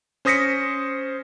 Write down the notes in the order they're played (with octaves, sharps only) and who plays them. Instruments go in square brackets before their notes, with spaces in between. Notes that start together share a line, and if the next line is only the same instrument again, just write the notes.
[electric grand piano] C#4 C5 D#6 A#6 B6 C#7